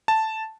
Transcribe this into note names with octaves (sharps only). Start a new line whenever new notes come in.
A5